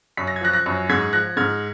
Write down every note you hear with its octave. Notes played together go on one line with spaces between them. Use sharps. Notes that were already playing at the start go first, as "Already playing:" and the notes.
F#2 B6
A#6
G#6
F3 F#6 A#6
F#6 A#6
F#2
G#2 G#6 B6
F3 F#6 A#6
G#2 F6 G#6